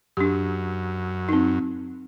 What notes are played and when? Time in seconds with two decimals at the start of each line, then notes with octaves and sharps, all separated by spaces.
0.17 F#2 D4 G4
1.29 C4 D#4